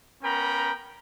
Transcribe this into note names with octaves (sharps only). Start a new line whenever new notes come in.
B3 C#4 A#4 G5 A#5 B5